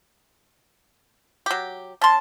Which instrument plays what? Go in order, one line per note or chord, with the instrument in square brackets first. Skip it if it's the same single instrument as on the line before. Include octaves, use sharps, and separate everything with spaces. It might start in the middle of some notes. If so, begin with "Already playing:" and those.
[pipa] F#3 G4
[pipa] C#4 C6 [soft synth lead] A5